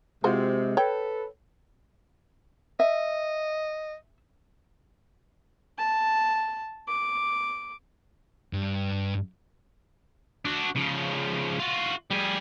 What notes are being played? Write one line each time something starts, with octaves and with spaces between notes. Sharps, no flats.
C3 G#3 F4 F#4 C5
A4 B4 C#5 G5
D#5 E5
A5
D6
G2
D4 F#4
C#3 F3
F4 F#4
G3 G#4